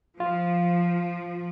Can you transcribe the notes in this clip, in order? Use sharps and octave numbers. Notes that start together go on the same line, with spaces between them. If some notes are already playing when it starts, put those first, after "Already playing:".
F3 F4